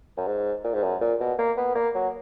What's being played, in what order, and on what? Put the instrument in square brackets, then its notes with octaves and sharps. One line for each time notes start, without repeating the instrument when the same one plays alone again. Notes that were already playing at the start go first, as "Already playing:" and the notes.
[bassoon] F#2
G#2
A#2
G#2
F#2
A#2
B2
A#3
B3
A#3
F#3